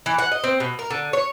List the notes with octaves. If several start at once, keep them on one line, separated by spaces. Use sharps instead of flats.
E3
F#5
D#5
C4
B2
A#4
D3
C#5